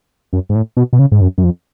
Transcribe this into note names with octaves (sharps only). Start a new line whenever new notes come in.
F#2
G#2
A2
B2
B2
C#3
G#2
F#2
F#2
F2